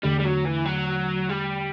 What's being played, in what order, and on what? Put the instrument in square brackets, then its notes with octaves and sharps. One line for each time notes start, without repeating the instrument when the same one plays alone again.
[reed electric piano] E2 D3 A3 [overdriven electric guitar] G3
[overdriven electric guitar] G3
F#3
E3
F#3
G3